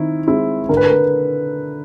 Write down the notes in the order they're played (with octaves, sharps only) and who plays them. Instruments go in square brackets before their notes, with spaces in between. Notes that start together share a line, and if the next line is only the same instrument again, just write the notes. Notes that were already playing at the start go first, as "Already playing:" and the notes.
Already playing: [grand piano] D#3 C4 E4
G#3 C4 E4
[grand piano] D3 [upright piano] A#4
[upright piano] B4
A#4
B4